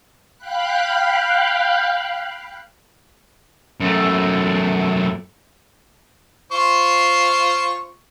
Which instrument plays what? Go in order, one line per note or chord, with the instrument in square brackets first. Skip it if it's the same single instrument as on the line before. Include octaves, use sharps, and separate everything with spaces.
[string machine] F5 G5 B5 F#6
[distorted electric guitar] F#2 A3
[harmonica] F4 C5 C#6